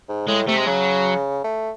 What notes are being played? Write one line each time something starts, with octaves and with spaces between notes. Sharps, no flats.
G#2
A2 G#3
C3 A3
G#3
C#3 F#3
A3